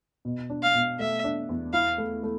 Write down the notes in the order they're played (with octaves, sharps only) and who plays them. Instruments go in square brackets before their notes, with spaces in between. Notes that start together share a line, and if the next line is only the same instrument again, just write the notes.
[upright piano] B2
D4
[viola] F5
[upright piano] B2
[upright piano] A3 [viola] E5
[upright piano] D4
E2
[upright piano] E4 [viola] F5
[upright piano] A3
A3